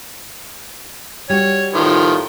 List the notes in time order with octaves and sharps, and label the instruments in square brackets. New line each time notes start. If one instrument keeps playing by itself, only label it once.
[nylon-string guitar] G3 F#4 [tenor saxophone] C#5
[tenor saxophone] A2 [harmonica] D#3 F3